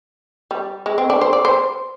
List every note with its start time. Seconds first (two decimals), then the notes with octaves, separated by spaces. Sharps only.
0.51 G3
0.86 G#3
0.98 C4
1.10 D4
1.21 C5
1.33 D5
1.45 C5